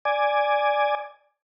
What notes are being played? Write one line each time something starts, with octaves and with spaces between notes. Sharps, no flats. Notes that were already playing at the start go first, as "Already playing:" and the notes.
D5 G#5